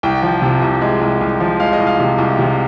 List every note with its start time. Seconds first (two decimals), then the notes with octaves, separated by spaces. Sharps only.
0.03 C2 G5
0.23 F3
0.42 C3
0.62 C2
0.81 G#3
1.01 C2
1.21 C2
1.40 F3
1.60 G#3 F5
1.73 D#5
1.79 C2
1.87 F5
1.99 C3
2.18 C2
2.39 C3